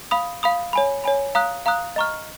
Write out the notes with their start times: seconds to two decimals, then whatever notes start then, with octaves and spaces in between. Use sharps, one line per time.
0.11 F5 B5 D#6
0.43 F5 B5 D#6
0.73 C#5 G#5 B5
1.04 C#5 G#5 B5
1.35 F5 A#5 D#6 F#6
1.66 F5 A#5 D#6 F#6
1.96 D#5 A#5 C#6 F6